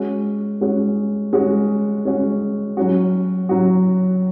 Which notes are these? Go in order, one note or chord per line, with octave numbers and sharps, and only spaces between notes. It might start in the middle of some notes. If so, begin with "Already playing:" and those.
Already playing: G#3 C#4 F#4
G#3 C#4 F#4
G#3 C#4 F#4
G#3 C#4 F#4
F#3 C#4 F#4
F#3 C#4 F#4